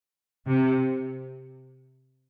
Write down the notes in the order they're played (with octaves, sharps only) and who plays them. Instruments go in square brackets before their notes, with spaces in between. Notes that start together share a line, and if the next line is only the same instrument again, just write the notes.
[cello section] C3